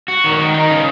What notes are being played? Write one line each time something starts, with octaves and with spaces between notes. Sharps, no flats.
F#4
D#3
D#3
D#4
C#3